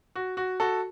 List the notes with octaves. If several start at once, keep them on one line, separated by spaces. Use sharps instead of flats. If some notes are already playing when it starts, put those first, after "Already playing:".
F#4
F#4
F#4 A4